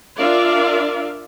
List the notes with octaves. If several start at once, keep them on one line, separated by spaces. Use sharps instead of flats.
D4 F4 A#4 D5 E5 F5